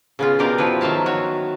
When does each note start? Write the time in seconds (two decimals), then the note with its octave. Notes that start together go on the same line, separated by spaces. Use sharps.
0.19 C#3 B3 F4
0.39 B2 B3 G4 A#4 D5 F5
0.58 F3 E4 B4
0.81 D#3 F#3 E5 F5 A5
1.06 F#4 C#5